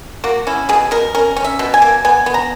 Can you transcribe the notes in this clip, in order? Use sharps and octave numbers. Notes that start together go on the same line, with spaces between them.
A#3 F#4
C#4 E4
B2 G#4
B2 A#4
C#4 A#4
C#4
E5
B2
G#5
A#3
B3 G#5
B3
A#5